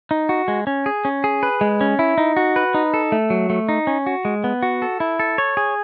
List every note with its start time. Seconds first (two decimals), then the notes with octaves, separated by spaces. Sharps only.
0.11 D#4
0.29 F#4
0.48 G#3
0.67 C#4
0.86 G#4
1.05 C#4
1.24 G#4
1.43 B4
1.61 G#3
1.81 C#4
1.99 E4
2.18 D#4
2.37 F#4
2.56 B4
2.74 D#4
2.94 A4
3.12 A3
3.30 F#3
3.50 A3
3.69 D#4
3.87 C#4
4.06 F#4
4.25 G#3
4.44 B3
4.63 F#4
4.82 A4
5.00 E4
5.20 A4
5.38 C#5
5.57 G#4